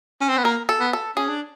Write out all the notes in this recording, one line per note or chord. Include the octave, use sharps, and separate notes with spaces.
C#4
C4
B3
A#3 A#4
A4
B3
A4
C#4 G#4
D4